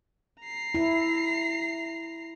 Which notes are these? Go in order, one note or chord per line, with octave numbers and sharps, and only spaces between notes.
A#5 C7
E4